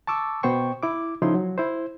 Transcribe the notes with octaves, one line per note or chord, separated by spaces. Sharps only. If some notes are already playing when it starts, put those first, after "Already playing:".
A5 C#6 D6 E6
B2 B3 C5 G5 C#6
E4 D6
C#3 F3 D#4 E4 C6
F#3
E4 C5